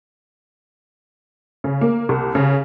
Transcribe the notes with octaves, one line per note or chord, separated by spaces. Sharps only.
C#3
A#3
C2
C#3